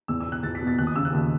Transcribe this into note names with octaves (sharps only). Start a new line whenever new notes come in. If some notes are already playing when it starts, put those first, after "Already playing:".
E2 E6
E6
B2
F#6
E2 A6
B6
B2
A6
D#2 F#6
D#6
C#3 E6
F#6
D#2